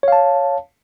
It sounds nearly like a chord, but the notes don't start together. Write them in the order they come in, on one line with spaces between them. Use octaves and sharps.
C#5 F5 A5